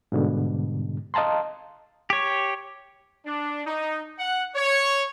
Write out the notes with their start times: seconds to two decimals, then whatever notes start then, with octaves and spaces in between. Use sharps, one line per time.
0.12 G#2 B2 D3 G3
1.14 D#5 F5 A5 A#5 C6
2.10 G4 C#5
3.26 D4
3.66 D#4
4.19 F#5
4.56 C#5